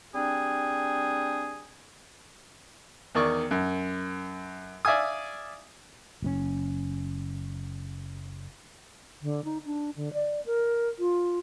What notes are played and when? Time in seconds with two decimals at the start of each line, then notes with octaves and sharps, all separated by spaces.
0.14 G3 C4 D4 G#4
3.15 E2 D#3 D5 C#6
3.51 F#2
4.85 D5 E5 F5 G#5 D#6
6.22 F#1 C3 C#4
9.22 D3
9.45 D#4
9.65 D4
9.96 D3
10.13 D5
10.46 A#4
10.99 F4